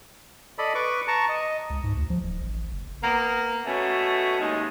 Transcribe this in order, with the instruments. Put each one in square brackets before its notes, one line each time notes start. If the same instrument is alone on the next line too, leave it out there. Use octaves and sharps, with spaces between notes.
[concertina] A4 D5 D#5 B5
B4 C#6 D6
A5 A#5 C#6
D#5
[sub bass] C#2
G#2
D2
F3
D1
A1
F#1
[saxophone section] A#3 B3
B2 A3 C#4
D#2 G#3 D#4